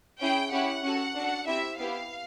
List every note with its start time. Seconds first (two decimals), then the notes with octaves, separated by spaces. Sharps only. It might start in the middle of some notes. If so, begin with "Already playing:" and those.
0.20 C#4 E4 G#4 G5
0.51 C#4 E4 G4 F#5
0.83 C#4 F#4 A4
1.15 D4 F#4 A4
1.46 C4 E4 G4 E5
1.77 B3 E4 G4 F5